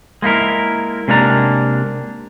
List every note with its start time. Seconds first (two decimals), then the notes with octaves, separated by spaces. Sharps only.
0.22 G#3 A#3 E4 A#4
1.08 C3 G#3 A#3 D4 A#5